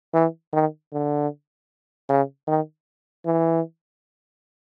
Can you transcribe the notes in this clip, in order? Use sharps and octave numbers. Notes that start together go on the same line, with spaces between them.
E3
D#3
D3
C#3
D#3
E3